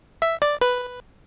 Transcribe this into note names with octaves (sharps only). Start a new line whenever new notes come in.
E5
D5
B4